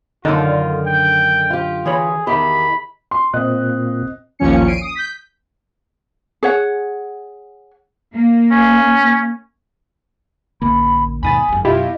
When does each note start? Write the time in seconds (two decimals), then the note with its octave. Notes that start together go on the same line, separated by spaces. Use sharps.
0.25 F#2 D3 D#3 D#4 F4
0.86 G5
1.50 F4 G4
1.86 E3 G#4 C#5 B5
2.27 E2 D#3 G4 B5
3.11 C6
3.33 A#2 C4 D#5 F#6
4.39 A1 D#2 A#2 F3 C#4 C#7
4.67 C7 D7 D#7
4.81 D#6
4.95 G6 B6
6.43 G#4 C#5 F#5
8.14 A#3
8.51 C#4
10.62 A1 D2 A#3 B5
11.23 D#2 G#2 B2 G#5 B5 D#6 A6
11.49 G1 F#2
11.65 F#2 B2 E4 F4 G4 D#5